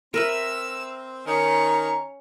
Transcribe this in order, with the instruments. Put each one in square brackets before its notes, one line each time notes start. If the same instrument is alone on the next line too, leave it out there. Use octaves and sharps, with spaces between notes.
[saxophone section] C4 [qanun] A#4 B4 E5 [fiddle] E6
[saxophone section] D#3 [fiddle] C#4 C#6 [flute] A#5